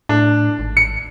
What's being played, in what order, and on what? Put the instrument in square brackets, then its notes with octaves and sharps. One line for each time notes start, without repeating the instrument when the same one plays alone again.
[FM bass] A2 [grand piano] D4
[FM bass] G#1
[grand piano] C#7